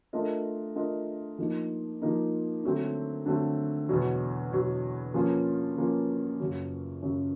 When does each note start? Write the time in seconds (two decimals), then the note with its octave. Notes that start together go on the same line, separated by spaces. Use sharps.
0.13 A3 D4 F4 A#4 D#5
0.76 A3 D4 F4 A#4 D#5
1.38 F3 A#3 D#4
2.02 F3 A#3 D#4
2.63 D3 F#3 A3 C4
3.26 D3 F#3 A3 C4
3.89 E2 B2 F#3
4.52 E2 B2 F#3
5.14 F3 A#3 C#4 F4
5.77 F3 A#3 C#4 F4
6.40 F#2 C#3 F#3
7.02 F#2 C#3 F#3